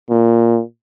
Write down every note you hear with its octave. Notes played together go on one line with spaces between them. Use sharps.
A#2